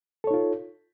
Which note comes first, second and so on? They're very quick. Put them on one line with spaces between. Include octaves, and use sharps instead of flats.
A4 C#5 D#4 F4